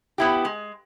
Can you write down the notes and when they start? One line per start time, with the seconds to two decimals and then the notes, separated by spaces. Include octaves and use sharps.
0.18 B3 E4 G4
0.45 G#3